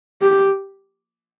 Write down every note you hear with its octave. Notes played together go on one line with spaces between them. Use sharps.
G4